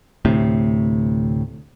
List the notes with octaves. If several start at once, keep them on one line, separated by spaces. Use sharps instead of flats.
D2 A2 C3